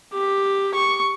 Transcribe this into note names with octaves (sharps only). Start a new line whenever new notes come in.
G4
C#6